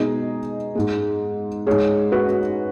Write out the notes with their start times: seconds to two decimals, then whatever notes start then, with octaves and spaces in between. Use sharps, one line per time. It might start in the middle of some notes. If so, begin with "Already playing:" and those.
Already playing: B2 G#3 D#4 G#4
0.75 G#2 G#3
1.67 G#2 G#3 G#4 C#5
2.12 F#4 B4